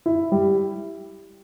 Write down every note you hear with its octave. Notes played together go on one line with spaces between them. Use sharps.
E4
G3